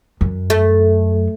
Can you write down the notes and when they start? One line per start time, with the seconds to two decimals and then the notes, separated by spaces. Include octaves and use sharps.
0.21 F#2
0.50 A3